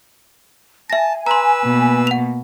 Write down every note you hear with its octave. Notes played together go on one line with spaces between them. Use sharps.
E5 G#5 A5 A#6
B4 A#5 C6 E6
B2 A#3
F#5 F7